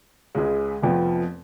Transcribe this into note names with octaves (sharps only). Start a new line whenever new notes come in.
C#2 C#3 G#3
F1 F2 F3 B3